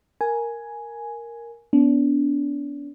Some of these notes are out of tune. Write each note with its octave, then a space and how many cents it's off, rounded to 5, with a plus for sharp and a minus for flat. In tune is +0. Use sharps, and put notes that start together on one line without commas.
A#4 +0 G#5 +5
B3 +0 D4 -35